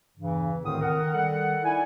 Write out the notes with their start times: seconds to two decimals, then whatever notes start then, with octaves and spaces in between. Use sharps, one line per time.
0.18 E2 G2 C#3 E3
0.62 D2 A2 D3 D#3 C4 D#6
0.80 D#3 A#4 F#5
1.14 D#3 G3 A4 F#5
1.63 D#4 E4 D5 G#5